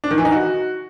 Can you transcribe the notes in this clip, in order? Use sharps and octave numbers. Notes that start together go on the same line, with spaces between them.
D4
D#3
E3
D#4
F#4